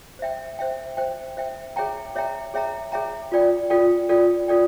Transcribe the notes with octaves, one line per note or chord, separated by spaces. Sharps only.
C5 E5 G5
C5 E5 G5
C5 E5 G5
C5 E5 G5
G#4 C#5 E5 G5 A#5
G#4 C#5 E5 G5 A#5
G#4 C#5 E5 G5 A#5
G#4 C#5 E5 G5 A#5
F4 A4 D5 G5
F4 A4 D5 G5
F4 A4 D5 G5
F4 A4 D5 G5